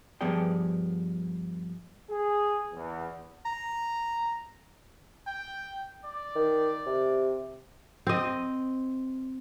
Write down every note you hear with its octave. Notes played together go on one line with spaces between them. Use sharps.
G2 F3 B3 G#4 D5 G5
G#4
E2
A#5
G5
D5
D#3
C3
C4 D#5